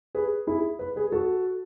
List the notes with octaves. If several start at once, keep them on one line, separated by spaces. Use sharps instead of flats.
G#4 B4
E4 G#4
B4
G#4 B4
F#4 A4